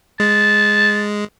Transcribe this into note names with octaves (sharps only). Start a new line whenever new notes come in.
G#3 A5